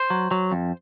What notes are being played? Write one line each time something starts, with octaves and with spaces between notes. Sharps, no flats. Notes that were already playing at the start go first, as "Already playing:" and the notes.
Already playing: C5
F#3
F#3
F2